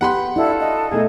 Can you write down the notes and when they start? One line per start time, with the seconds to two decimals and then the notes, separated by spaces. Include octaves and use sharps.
0.01 B3 G4 F#5 B5 C6
0.36 D4 E4 F#4 A4 F5
0.60 D#5
0.91 B2 A3 D#4 E4 G#4